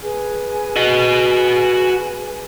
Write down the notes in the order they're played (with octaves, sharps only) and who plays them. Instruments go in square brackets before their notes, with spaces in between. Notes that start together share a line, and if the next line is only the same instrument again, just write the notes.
[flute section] G#4 B4 G#5
[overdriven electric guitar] F#4 D#5